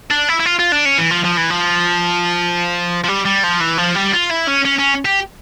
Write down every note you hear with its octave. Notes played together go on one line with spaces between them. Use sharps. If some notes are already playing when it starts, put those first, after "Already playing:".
D4
E4
E4
F4
F4
D4
C#4
E3
F3
F3
E3
F3
F3
G3
G3
F3
E3
F3
G3
F4
E4
C#4
C#4
C#4
G4